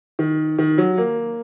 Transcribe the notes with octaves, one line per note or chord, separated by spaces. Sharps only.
D#3
D#3
F#3
A#3